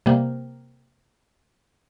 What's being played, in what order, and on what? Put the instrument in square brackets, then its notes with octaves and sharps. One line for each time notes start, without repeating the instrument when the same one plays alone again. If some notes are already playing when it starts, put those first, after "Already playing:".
[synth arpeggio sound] C3 G3 A#3